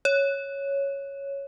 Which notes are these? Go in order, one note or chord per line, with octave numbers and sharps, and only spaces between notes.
C#5